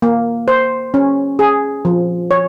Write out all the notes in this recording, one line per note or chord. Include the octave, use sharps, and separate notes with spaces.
A#3
C5
C#4
G#4
F3
C#5